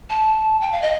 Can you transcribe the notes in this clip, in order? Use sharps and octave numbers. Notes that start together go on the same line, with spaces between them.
A5
G5
F5
D#5